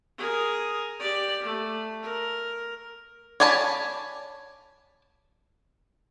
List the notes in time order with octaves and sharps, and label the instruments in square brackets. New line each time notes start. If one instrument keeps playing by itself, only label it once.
[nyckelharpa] G#4 A#4
G4 D5
A3
A#4
[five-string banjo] C#5 D5 G#5 A5 B5